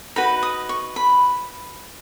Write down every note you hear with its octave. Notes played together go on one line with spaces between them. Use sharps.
D#4 F#4 B4 B5
D#6
C#6
B5